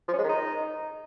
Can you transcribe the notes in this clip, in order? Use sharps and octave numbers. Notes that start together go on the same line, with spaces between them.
F3
C#4
G#3
D#3
D#4